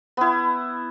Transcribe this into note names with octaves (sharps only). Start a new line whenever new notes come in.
B3 E4